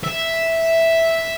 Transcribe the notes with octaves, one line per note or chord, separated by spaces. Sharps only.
E5